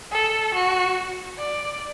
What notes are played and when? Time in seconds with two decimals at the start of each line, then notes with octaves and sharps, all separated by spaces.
0.12 A4
0.54 F#4
1.39 D5